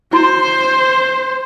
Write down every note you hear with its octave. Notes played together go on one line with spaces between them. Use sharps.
E4 F#4 C5 C6